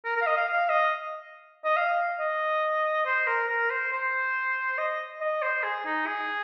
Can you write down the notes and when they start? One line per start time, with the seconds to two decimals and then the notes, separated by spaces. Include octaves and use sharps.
0.05 A#4
0.16 A#4
0.22 F5
0.26 D#5
0.37 F5
0.48 F5
0.69 D#5
1.65 D#5
1.77 F5
2.20 D#5
3.06 C5
3.27 A#4
3.49 A#4
3.71 C5
3.92 C5
4.78 D#5
5.21 D#5
5.42 C5
5.63 G#4
5.86 D#4
6.07 G#4